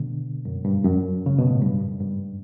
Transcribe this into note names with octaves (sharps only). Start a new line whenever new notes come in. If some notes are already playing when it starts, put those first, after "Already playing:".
Already playing: B2 D3
F#2
G2
F#2
C#3
B2
A2
G2
F#2
G2